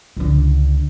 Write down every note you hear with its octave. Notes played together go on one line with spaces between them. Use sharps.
C#2 D3